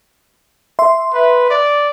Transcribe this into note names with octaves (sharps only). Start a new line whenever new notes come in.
E5 C6
B4
D5